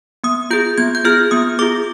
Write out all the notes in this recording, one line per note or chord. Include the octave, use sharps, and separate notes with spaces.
B3 D#6
F4 G#4 G6
B3 G#6
G6
F4 G#4 F6
B3 D#6
F4 G#4 D6